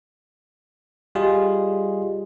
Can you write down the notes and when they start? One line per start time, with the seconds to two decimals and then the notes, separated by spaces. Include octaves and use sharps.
1.15 G3 F4 G4 G#4 D#5